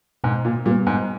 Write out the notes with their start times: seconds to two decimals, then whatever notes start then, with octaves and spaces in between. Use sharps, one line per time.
0.24 G#2 B2
0.45 A#2
0.66 A#2 G3 B3
0.87 G#2